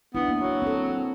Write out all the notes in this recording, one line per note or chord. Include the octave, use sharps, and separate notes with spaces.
B3 D4 E4
A#3
F#3
C4 A4